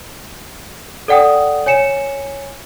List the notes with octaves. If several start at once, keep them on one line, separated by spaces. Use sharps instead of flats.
A4 D5 F#5 G5 D#6
C#5 G#5 C#7 E7